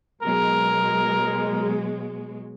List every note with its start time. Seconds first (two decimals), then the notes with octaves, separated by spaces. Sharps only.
0.23 B2 F#3 G#3 A#4